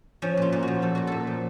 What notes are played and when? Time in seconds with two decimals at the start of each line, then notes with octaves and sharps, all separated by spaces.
0.22 F3 C#4
0.37 A#2 F4
0.52 A#2
0.63 F3 F#4
0.82 F3 A4
0.95 A#2 F#4
1.07 A#2 A4
1.27 F3